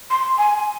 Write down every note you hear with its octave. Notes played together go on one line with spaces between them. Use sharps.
C6
G#5